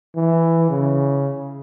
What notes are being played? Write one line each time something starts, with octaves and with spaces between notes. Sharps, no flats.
E3
C#3